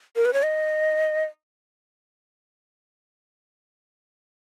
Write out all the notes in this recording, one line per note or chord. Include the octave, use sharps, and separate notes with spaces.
A#4
B4
C#5
D#5